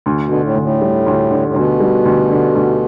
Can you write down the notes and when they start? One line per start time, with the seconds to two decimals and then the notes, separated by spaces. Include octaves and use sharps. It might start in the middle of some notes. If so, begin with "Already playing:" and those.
0.06 D2
0.25 B2
0.31 D3
0.44 A2
0.56 D2
0.62 A2
0.81 G3
1.06 D2
1.31 D3
1.48 A2
1.55 D2 B2
1.80 G3
2.05 D2
2.30 D3
2.55 D2